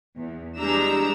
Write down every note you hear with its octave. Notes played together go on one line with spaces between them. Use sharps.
E2
E3 G3 G#3 D4 A#5 E6